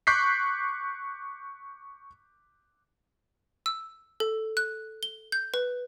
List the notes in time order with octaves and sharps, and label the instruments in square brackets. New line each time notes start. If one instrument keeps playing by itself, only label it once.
[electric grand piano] C#6 D6 F#6 G6 B6 C7
[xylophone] E6
A4
F#6
G7
G6
B4